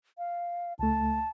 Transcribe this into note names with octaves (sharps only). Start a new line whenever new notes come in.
F5
C#2 A3 A5